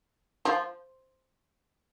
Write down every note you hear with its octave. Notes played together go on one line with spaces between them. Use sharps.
F3